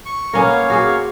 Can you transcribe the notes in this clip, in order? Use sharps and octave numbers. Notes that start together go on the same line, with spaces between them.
C#6
A#3 B3 C#4 A#4 C#5 F5
F#4 G#4 C5